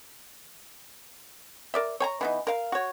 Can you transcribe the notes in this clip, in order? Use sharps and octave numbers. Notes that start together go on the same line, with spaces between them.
A#4 D5 E5
C#5 G#5 A#5
E3 B3 D#4
A#4 F5
F#4 C#5